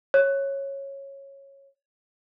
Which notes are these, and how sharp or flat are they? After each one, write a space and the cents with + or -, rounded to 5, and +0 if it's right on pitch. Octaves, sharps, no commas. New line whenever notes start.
C#5 -10